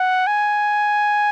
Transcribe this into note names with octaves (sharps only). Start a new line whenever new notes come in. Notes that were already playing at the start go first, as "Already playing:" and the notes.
Already playing: F#5
G#5